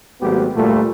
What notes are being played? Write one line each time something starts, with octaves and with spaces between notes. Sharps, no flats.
G#1 F#3 A3 B3 F#4 G4
D2 A#2 G3 A3